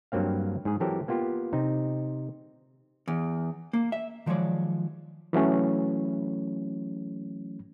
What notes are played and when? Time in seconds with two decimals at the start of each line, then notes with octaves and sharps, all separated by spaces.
0.12 G2 F#3 A#3 C4 F5
0.65 G#2 G#4
0.80 E3 F#3 C4 G4 A4 A#4
1.08 A#3 B3 F4 G4
1.53 C3 C4 D#4
3.08 E2
3.73 A#3
3.92 E5
4.26 D#3 F3 F#3 G#3 C#5 D5
5.33 E3 F#3 A3 C#4